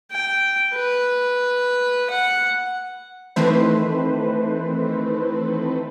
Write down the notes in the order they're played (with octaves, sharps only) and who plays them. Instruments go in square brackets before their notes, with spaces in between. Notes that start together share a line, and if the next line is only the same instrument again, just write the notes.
[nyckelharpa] G5
B4
F#5
[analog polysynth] D#3 E3 A3 C4 B4 C5